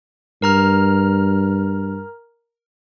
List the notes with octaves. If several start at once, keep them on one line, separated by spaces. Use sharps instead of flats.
G2 A#4 A#5 F6